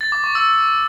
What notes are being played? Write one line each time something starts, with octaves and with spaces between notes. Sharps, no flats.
A6
D6
C#6
E6